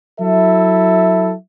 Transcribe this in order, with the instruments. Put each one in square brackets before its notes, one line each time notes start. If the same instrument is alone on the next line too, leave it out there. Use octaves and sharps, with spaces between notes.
[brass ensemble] F#3 E4 A4 E5